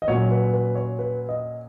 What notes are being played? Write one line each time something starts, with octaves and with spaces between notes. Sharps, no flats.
D#5
A#2 F#3 C#4 C#5
B4
B4
C#5
B4
D#5